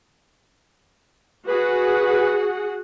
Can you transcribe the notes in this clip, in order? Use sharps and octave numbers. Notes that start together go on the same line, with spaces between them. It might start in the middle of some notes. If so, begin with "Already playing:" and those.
F#4 G#4 B4 F#5